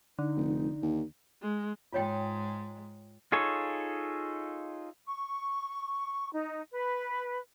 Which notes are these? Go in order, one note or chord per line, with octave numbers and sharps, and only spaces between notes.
D3 D#4
F1
D#2
G#3
G#2 G#3 F4 C#5 G5
D#4 F4 G#4 A4 C#5
C#6
D#4
B4